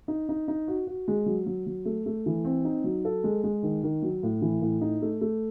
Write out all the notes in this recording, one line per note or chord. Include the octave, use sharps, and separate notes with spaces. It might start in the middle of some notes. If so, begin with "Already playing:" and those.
D#4
D#4
D#4
F#4
F#4
G#3
F#3
F#3
F#3
A3
A3
E3
C4
D#4
F#3
A4
G#3
G#3
D#3
D#3
F#3
A2
E3
A2
D#4
A3
A3